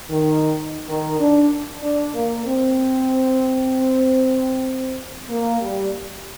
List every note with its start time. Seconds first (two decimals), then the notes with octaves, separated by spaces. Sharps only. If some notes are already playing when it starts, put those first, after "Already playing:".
0.10 D#3
0.89 D#3
1.20 D4
1.83 D4
2.15 A#3
2.46 C4
5.29 A#3
5.61 G3